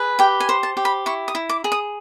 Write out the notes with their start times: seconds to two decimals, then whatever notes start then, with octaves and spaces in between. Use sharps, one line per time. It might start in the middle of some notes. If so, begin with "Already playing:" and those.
Already playing: G#4 B4
0.19 G4 G5
0.40 G#5
0.49 C5
0.63 A5
0.77 G4
0.85 B5
1.06 E4 C#6
1.28 D#6
1.35 E4
1.49 D6
1.64 G#4
1.72 D#6